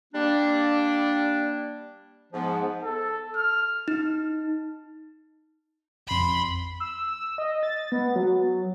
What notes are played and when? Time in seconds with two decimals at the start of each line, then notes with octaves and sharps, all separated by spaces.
0.14 G3 A#3 D4
2.33 G#2 F3 B3
2.83 A4
3.36 F6
3.88 D#4
6.07 A1 F2 B5 C6
6.80 E6
7.38 D#5
7.63 A6
7.92 B3
8.16 F#3